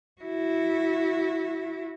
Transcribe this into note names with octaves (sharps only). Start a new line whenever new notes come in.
E4 F#4